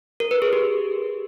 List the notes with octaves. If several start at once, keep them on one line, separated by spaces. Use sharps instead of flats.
A#4
B4
G#4
G4